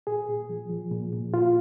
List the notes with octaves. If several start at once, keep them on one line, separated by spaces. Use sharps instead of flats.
A#2 G#4
A#2
F3
F3
A#2
A#2
A#2 F4